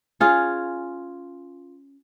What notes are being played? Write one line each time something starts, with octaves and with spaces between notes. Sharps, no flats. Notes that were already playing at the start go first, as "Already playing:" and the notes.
C#4 F4 G#4